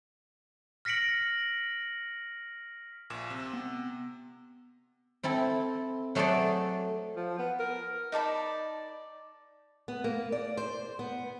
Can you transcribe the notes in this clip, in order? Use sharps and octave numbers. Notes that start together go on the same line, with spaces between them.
F6 A#6 B6 C#7 D7 F#7
A#1 A#2 E7
C3
B3
C4 E4 A4
F#3 A3 G#4 A4 C5 D5
F3
B3
A#4
D#4 D5 A5 B5
B3
A#3
D5
C5
B3